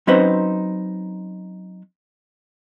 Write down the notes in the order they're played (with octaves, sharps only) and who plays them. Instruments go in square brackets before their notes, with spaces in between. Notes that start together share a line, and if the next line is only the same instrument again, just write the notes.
[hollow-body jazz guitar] F#3 C4 C#4 D#4 B4 C5